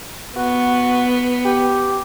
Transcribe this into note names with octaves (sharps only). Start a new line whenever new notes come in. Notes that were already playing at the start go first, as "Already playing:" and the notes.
B3 F#4
G4